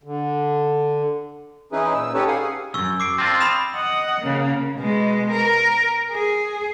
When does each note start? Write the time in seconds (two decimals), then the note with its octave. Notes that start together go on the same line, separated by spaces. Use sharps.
0.03 D3
1.72 E3 C#4 D#4 E4 G#4 B4
1.94 A#2 E6
2.14 C#4 D#4 G4 A4 B4 C#5
2.28 F5 F#5 G#5
2.40 G#4
2.74 C#2 F#2 C#6 E6
3.00 D6 C7 D7
3.18 C4 D4 F4
3.41 B5 D#6 E7
3.75 D#5 F#5
4.20 C#3 A#3
4.76 B2 G#3
5.32 A#4
6.12 G#4